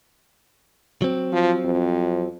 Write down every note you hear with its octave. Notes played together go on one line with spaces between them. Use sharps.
F#3 C4
F3
F2